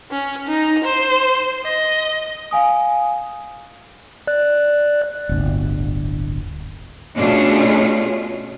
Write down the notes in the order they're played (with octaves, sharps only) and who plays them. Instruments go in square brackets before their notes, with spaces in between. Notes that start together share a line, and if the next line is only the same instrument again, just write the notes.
[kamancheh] C#4
D#4
C5
D#5
[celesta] F5 G#5 D#6
[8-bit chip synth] D5 F#6
[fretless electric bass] D1 G1
[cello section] B2 A3 C#4 D4 F4 G#4